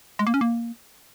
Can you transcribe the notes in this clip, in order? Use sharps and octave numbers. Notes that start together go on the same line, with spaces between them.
G#3
A#3
C#4
A#3